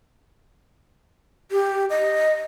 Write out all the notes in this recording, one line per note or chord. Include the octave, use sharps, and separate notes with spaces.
G4
D#5